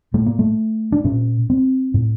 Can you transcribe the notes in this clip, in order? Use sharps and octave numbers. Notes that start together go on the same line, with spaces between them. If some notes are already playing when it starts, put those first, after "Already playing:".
A2 A3
A#3
A3
D4
A#2 C#4
C4
A2